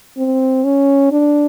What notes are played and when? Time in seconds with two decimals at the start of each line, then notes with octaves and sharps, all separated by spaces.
0.17 C4
0.64 C#4
1.12 D4